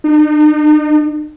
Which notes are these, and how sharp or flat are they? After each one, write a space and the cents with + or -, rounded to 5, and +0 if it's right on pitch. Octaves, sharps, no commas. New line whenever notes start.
D#4 -40